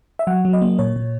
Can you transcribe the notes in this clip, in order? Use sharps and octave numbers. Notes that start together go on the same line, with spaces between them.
E5
F#3 F#5
F#3
D#5
A#3
A#2 C#5
A#2